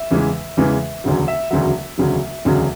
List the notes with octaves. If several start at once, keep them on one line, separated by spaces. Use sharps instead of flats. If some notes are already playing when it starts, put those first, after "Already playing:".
Already playing: E5
E2 C#3 E3 G#3
E2 C#3 E3 G#3
E1 D2 C#3 F#3
E5
E1 D2 C#3 F#3 E5
E1 D2 C#3 F#3
E1 D2 C#3 F#3